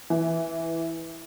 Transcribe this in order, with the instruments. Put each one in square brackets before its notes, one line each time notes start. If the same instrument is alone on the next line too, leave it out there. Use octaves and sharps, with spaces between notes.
[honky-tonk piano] E3